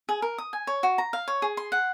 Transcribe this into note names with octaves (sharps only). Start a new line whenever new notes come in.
G#4
A#4
D#6
G#5
C#5
F#4
A#5
F5
C#5
G#4
C6
F#5